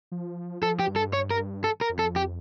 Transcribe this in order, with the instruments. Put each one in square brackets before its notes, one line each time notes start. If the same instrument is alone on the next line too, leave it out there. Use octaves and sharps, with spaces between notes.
[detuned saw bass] F3
[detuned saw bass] F3 [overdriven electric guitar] A4
[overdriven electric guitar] G4
[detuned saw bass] G2
[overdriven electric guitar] A4
C#5
A#4
A4
A#4
[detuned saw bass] F2
[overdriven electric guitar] A4
G4